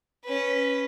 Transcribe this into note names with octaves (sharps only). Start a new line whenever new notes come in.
C#4 B4